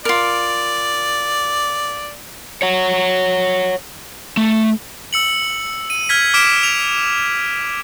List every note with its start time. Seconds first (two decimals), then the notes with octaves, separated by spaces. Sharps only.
0.05 F4 A#4 D5
2.62 C#5 F#5
4.37 A3
5.13 E6 C#7 F#7
5.90 D#7
6.09 F6 G#6 B6
6.34 D6 F6 B6 D7 E7
6.63 F7